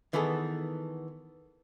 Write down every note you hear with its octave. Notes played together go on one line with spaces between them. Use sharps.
D#3 E3 B3 G#4 A4